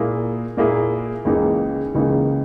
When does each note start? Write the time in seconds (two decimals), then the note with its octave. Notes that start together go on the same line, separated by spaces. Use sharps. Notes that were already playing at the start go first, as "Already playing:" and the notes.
Already playing: A#2 A#3 E4 G#4
0.57 A#2 A#3 E4 G#4
1.25 C#2 C#3 E3 A#3 D#4
1.95 C#2 C#3 E3 A#3 D#4